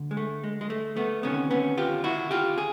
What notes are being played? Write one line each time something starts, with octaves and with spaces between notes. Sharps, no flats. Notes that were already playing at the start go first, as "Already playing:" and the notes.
Already playing: D2 D3
G#3
A3
G#3
G#3
A3
A3 B3
D2 C3 D#3 B3 C#4
B3 C#4
F4 G4
E4 F#4
F4 G4
G#4